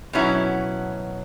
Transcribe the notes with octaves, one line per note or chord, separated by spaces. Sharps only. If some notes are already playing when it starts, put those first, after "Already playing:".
B2 F#3 C#4 E4